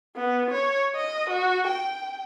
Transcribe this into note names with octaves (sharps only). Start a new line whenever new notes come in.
B3
C#5
D#5
F#4
G5